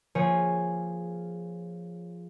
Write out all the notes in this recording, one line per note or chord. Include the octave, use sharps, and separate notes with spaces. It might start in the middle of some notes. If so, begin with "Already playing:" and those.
F3 A#3 G#4 C#5